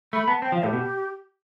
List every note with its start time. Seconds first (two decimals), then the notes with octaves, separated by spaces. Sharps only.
0.13 A3 B5
0.28 B3 A5
0.42 C4 G5
0.52 F3 F5
0.63 A2 G4
0.73 B2